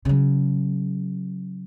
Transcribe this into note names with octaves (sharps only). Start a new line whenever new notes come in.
C#3 F#3